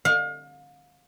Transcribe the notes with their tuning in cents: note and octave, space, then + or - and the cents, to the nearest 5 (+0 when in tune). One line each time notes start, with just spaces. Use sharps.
F5 +35